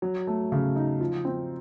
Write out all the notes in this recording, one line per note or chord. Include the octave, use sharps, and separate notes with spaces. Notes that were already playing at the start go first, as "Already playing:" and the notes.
F#3
A3
C#3
D#4
F3
C4